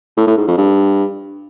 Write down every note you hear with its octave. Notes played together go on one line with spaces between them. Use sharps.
A2
A2
G#2
F2
G2